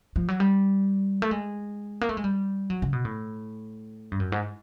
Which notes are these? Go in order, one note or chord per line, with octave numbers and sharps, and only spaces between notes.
F3
F#3
G3
A3
G#3
A#3
A3
G#3
G3
F#3
C#3
B2
A2
G2
F#2
G#2